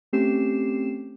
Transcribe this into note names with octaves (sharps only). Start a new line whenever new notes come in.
A3 C4 C#4 G4 C7 E7